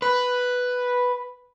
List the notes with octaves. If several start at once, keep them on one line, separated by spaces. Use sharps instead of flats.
B4